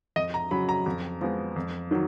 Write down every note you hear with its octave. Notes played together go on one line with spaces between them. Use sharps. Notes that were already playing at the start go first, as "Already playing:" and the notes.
F2 D#5
A#5
C#3 F#3 B5
A#5
F2
F3 G#3 B3
F2
D#3 F#3